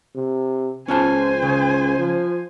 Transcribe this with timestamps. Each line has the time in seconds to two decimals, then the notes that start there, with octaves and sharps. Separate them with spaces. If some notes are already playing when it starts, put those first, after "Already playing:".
0.15 C3
0.88 C#2 C#4 F4 C5 G#5 A5
1.42 C#3
1.99 F3